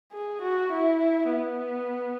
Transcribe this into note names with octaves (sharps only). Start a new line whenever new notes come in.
G#4
F#4
E4
B3